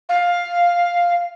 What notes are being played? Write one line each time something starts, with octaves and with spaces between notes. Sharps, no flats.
F5